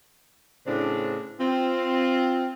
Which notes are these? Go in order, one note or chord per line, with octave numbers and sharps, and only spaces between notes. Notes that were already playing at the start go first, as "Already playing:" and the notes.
A2 C#3 C4 D4
C4 F4